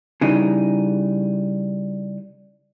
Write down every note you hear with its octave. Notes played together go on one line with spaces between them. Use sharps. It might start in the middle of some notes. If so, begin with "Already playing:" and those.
C#3 E3 G3 D#4